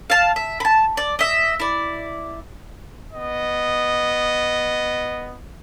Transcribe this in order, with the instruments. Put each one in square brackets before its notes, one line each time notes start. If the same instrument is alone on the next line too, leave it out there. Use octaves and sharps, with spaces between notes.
[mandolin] F5 A5
E5
A5 B5
D5
D#5 E5
E4 D5
[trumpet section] B3 D#5